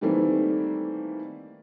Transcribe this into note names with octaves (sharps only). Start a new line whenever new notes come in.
D#3 E3 G3 A3 A#3 C4